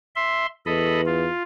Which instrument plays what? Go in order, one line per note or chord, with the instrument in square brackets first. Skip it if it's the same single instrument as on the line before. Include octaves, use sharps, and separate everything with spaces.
[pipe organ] E5 C6
[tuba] E2 [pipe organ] A4 D#5 B5
[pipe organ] F4